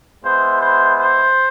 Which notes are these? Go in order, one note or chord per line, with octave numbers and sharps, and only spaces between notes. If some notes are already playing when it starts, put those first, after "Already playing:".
G#3 B3 E4 C5
C5
C5